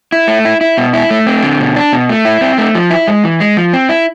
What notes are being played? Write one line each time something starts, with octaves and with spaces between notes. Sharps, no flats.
E4
A3
E4
E4
B2
E4
A3
C4
D3
B2
D4
B2
A3
E4
C4
A3
F3
E4
G#3
E3
G#3
F3
C4
E4